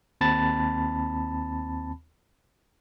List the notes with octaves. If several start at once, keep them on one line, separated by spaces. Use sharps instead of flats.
D#2 C4 A5 B5 A6